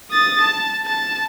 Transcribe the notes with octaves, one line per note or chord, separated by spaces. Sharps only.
D#6 A6
A5
A5